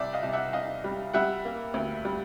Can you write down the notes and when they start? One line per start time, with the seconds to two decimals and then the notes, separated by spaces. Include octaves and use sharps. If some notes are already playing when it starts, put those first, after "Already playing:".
Already playing: C2 D5 E5
0.13 D#5 F5
0.23 C2
0.33 E5 F#5
0.53 C2 D#5 F5
0.84 G3
1.13 G3 E5 F#5
1.45 A#3
1.74 D2
2.05 G3